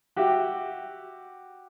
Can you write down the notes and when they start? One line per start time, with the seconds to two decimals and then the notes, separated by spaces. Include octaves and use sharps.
0.16 F#4 G4 E5